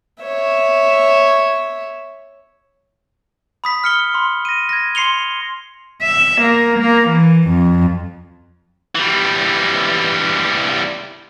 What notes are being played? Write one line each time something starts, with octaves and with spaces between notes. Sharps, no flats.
C#5 E5
B5 D#6 B6
F6 C#7 G7
B5 C6
A#6 D#7
G#6 A#6
C6 C7 C#7 F7 G7
E5
A#3
A#3
E3
F2
E3 G3